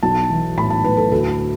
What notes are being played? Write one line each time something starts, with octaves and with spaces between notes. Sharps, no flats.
B1 A5
E3
A2 B5
A5
A2 B4
A4
D2 A4